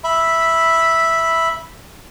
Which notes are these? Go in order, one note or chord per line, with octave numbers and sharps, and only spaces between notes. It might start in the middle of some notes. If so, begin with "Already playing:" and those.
E5 B5